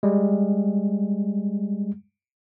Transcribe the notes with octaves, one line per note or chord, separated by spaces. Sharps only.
G3 G#3